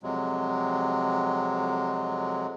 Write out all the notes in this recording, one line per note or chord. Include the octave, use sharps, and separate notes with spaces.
F2 C3 F#3 G#3